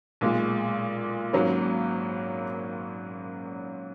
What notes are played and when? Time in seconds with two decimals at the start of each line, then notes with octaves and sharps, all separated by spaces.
0.21 B1 A#2 G#3
1.33 G#1 G#2 F#3 A#3 C#4